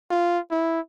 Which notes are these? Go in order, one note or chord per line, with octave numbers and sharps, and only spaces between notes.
F4
E4